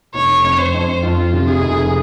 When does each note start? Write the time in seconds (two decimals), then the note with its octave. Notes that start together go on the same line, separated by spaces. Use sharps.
0.14 F1 C#5
0.44 F2
0.59 C5
0.74 F2
1.03 F2 F4
1.33 C3
1.47 G#4
1.61 F1